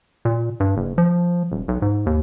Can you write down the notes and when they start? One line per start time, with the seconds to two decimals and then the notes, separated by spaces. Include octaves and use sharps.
0.25 A#2
0.60 G2
0.77 F#1
0.98 F3
1.52 D#1
1.68 B1
1.82 G#2
2.06 D#2